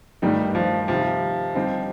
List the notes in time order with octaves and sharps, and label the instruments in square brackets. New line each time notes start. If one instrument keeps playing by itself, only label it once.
[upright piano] G2 D#3 A3 D#4 G4 [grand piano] G3
[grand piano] F3
[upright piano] C3 D#3 G3 [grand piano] F3
[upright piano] D3 G3 C4 D#4 G4